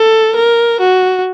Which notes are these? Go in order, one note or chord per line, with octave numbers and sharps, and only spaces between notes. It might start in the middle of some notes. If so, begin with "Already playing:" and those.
Already playing: A4
A#4
F#4